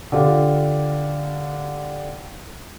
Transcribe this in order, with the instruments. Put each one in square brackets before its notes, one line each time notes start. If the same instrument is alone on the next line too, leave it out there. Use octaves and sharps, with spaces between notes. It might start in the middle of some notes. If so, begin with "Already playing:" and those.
[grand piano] D3 F4 G4